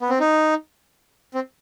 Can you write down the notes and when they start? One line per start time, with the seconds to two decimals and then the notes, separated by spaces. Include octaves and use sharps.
0.01 B3
0.10 C4
0.20 D#4
1.34 C4